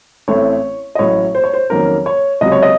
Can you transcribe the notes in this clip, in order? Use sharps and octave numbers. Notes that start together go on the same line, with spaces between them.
A1 A2 A3 C4 C#5
D#5
A1 A2 F#3 C#5
C5
C#5
C5
F2 D#3 F#3 A#3 C#4 A#4
C#5
C#2 C3 F#3 D#5
C#5
D#5